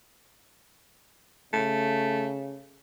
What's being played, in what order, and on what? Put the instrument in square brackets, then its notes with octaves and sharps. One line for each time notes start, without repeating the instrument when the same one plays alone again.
[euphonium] C#3 [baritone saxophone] A3